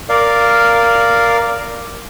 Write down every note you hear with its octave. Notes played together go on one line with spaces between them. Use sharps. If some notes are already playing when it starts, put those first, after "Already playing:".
A#4 D5 F5